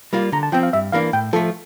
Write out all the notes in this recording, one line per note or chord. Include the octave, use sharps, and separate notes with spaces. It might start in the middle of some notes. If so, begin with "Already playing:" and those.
G3 A#3 F4
D3 A#5
A5
F3 C4 G5
F5
G2 E5
E3 A#3 D4 F5
A2 G5
F3 A3 A4